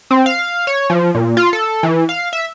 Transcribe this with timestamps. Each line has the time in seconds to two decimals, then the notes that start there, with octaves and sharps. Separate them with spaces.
0.11 C4
0.26 F5
0.67 C#5
0.90 F3
1.15 A#2
1.37 F4
1.53 A4
1.83 E3
2.09 F5
2.33 E5